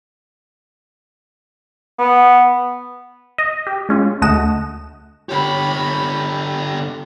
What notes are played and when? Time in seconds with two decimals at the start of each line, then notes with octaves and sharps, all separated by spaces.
1.99 B3
3.38 D#5
3.67 G4
3.89 G#3 C#4 F4
4.22 D2 A3 D#5 F#5 E7
5.29 D3 G4 C#5 B5